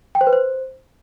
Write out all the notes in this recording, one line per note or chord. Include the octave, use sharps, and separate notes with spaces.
G5
C5
B4
C5